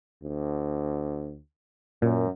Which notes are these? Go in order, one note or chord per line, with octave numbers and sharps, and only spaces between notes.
D2
F#2 A#2